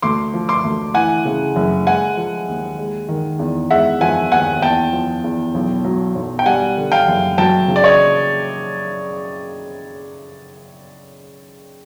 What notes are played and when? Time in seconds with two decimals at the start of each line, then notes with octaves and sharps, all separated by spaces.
0.02 D2 C6 D6
0.34 F3
0.49 C6 D6
0.64 D2
0.94 E3 F#5 G#5
1.25 C#3
1.56 F#1
1.87 G#3 F#5 G#5
2.17 F3
2.48 D#2
2.78 G#3
3.09 D#3
3.39 E2
3.70 G#3 E5 F#5
4.01 F3 F#5 G#5
4.32 D#2 F#5 G#5
4.62 E2 G5 A5
4.93 F3
5.24 E2
5.54 B1
5.84 F#3
6.15 B1
6.39 G5
6.46 G3 F#5 G#5
6.77 D3
6.92 F5 G5
7.08 F#1
7.38 F#3 G5 A5
7.68 C#3
7.76 D5
7.84 C#5 D#5